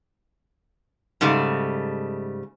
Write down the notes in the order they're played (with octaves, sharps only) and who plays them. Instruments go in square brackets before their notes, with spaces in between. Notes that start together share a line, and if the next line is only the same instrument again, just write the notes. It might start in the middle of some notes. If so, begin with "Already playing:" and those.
[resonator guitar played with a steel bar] G#2 C#3 G3 A3